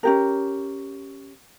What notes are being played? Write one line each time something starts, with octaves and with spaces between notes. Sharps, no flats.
C#4 G4 A#4